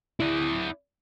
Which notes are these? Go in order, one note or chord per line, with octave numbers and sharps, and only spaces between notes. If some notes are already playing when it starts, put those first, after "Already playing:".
E4 D5